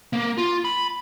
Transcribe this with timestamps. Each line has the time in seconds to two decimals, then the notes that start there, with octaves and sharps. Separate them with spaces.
0.13 A#3
0.38 F4
0.65 B5